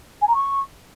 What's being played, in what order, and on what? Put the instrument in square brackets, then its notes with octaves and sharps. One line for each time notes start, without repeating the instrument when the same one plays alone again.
[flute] G#5
A#5
C#6